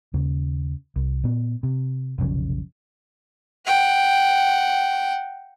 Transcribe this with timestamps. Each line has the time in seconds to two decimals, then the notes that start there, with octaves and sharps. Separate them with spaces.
0.14 D#2 C#3
0.96 C2
1.24 A#2 B3
1.63 C3
2.18 F1 B1 C#3 F3
3.66 F#5 G5